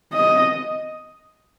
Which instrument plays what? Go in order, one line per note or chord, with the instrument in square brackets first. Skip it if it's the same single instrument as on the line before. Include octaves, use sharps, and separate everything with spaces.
[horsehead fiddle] D#5